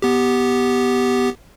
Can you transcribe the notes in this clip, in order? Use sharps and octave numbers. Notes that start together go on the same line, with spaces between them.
B3 G4